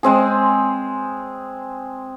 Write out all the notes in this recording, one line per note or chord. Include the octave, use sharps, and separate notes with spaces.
G#3 C4 G#4